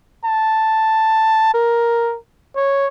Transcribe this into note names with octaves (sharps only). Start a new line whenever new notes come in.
A5
A#4
C#5